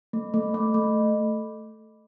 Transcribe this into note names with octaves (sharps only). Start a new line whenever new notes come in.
A3
A3
A3
A3